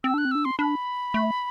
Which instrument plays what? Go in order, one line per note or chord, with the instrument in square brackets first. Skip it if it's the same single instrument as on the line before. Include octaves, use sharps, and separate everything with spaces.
[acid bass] C4 [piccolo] E6
[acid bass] D4 [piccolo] F#6
[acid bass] C4
[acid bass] D4 [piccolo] E6
[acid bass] C4 [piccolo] C6
[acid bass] D4 [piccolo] B5
[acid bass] A3